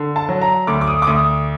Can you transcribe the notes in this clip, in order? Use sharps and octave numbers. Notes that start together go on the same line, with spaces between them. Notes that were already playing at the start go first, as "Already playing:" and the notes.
Already playing: D3
A5
F#3
A#5
D2 D6
D6
D#6
D6
D2 D#6